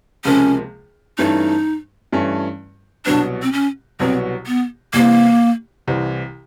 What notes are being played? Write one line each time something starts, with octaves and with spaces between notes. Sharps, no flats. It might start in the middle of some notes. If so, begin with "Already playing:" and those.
C#2 C3 F3 A#3 C#4
G2 E3 A3 C#4 D#4
G2 E3 A3 C#4
C2 B2 F#3 B3 D4
C4
C#4
C2 B2 F#3 B3 C4
B3
C2 C3 E3 A#3
C2 C3 E3